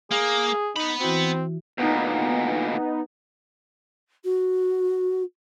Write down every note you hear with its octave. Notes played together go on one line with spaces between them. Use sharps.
A#3 G#4
B3 D#4 B5
E3 C4 E4 F#4
D2 A#2 B3 D#4
F#4